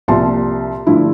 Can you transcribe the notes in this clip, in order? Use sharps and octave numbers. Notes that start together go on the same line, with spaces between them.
C2 A#2 F3 A5 C6
G2 D3 F3 A3 E4